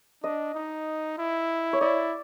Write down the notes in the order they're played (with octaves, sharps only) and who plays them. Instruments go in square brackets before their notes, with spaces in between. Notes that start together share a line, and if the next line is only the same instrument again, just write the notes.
[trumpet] D4 [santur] D#5
[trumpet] D#4
E4
[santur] C#5
[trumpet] E4 [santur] D5